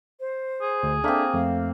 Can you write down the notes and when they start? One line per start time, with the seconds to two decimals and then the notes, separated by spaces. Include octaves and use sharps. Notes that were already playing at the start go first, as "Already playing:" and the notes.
0.20 C5
0.61 G#4
0.83 D2
1.04 A#3 C4 D4 A4 E5
1.34 F2 A3 F5